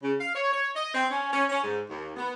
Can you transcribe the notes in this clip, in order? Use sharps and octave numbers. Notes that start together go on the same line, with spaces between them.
C#3
F5
C#5
C#5
D#5
C4
C#4
C#4
C#4
G#2
D#2
B3